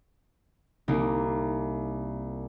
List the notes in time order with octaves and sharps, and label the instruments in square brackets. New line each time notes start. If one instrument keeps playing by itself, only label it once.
[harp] C2 A#3 D#4